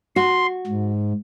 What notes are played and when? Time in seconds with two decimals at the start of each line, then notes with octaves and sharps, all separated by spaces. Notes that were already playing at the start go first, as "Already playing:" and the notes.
0.16 F#4 C6
0.66 G#2